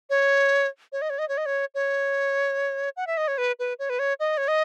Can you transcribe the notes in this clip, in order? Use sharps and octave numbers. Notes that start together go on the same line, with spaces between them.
C#5
C#5
D#5
C#5
D#5
C#5
D#5
C#5
C#5
F#5
E5
D#5
C#5
B4
B4
C#5
B4
C#5
D#5
C#5
D#5